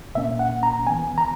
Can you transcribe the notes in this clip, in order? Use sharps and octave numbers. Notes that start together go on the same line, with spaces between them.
A#2 A#3 C#4 E5
F#5
A#5
E3 B3 G#5
A#5